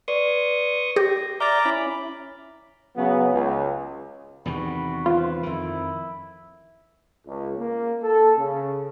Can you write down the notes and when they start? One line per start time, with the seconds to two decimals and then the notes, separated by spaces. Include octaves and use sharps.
0.08 B4 D5 C6 C#6 D#6
0.96 G4 A#6
1.40 D5 E5 A#5 D6 F6 G6 A6
1.65 C#4 E4 B5
2.97 C#3 F#3 B3
3.33 C#2
4.46 E2 C3 D#3 F#4 B5
5.06 F4 B4 C5
5.43 F2 D#3 E4
7.26 C#2
7.56 A#3
8.02 A4
8.37 C#3